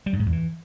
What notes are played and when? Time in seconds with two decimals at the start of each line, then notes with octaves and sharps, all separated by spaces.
0.06 G3
0.13 F#2
0.19 G#2
0.26 E2
0.32 E3